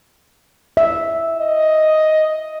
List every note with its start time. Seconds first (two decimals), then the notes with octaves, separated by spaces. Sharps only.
0.77 E5
1.38 D#5